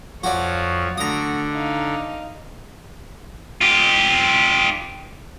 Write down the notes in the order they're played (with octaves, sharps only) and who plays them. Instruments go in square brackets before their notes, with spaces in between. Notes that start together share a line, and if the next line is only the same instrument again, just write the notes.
[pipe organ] F2 F3 [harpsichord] F#4 D5 [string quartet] C#5 F5
[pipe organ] D3 [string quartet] A3 D4 F#4 [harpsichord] A#5 D#6
[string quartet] D#4 F5
[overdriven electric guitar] F4 G4